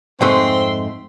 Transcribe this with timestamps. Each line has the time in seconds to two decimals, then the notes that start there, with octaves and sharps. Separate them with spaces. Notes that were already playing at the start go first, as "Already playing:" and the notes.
0.21 F2 G#2 A3 C4 C6